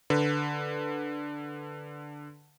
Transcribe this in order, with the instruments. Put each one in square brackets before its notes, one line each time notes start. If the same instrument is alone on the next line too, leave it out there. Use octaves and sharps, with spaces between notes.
[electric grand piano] D3 B4